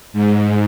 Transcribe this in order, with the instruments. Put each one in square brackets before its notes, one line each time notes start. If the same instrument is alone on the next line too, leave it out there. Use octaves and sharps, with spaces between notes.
[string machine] G#2